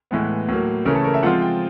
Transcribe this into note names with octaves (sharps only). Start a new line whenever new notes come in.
A2 E3 G#3 B3
A2 F#3 A#3
C#3 E3 A3 C#4 A#4
A4
A#4
E5
F3 G#3 C4 F4 F#5
G5